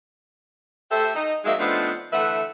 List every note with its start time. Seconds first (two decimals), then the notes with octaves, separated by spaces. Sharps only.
0.92 A3 G4 A4 C5 E5
1.15 D#4
1.45 F#3 G#3 A#3 D#4 E5
1.59 F3 A3 B3 C4 D4 D#4
2.13 D3 E3 A3 B4 E5 F#5